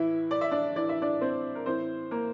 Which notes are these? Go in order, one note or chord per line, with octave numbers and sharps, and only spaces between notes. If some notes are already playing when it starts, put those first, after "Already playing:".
Already playing: A2 E3 E4 E5
D5
E5
D4 D5
A2 E3 D5
E5
D4 D5
C4 C5
A#4
A2 E3 C4 C5
A#3 A#4